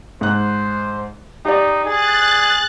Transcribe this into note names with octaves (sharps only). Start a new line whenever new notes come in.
G#2 C5 F#6
D#4 G4 D5
G#4 F#6 A6